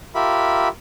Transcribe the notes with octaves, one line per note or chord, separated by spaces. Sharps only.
F4 G4 A#4 E5 B5